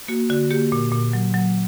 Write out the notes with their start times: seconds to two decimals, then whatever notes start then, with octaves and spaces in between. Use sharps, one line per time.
0.08 A#3 F#4
0.30 D3 F#4
0.51 A#3 G4
0.72 A#2
0.92 A#2
1.13 F#3
1.34 F#3